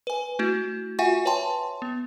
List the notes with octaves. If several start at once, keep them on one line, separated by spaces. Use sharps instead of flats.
B4 G#5
A3 E4 F#4
F4 F#4 E5 F#5 G#5 C#6
B4 C#5 E5 G5 A5 C6
B3